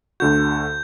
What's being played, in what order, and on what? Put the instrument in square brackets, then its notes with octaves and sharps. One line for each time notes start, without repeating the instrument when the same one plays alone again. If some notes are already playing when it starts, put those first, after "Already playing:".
[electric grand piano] D2 D3 F#4 [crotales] G6